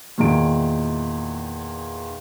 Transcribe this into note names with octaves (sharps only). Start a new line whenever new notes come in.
E2 A#2 D#3 D7